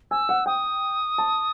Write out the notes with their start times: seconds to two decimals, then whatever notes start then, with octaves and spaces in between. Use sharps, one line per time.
0.11 G#5 E6
0.29 F#5
0.46 G5 D#6
1.18 A5